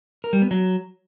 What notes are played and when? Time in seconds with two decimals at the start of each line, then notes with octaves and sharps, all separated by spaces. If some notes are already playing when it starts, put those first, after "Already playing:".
0.24 A#4
0.33 G3
0.42 B3
0.51 F#3